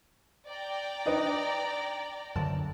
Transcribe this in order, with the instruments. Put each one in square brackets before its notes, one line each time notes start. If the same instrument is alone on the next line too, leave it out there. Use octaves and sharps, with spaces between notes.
[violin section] D5 G5 A#5
[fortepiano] D4 D#4 B4
[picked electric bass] F#2 D3 [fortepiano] A5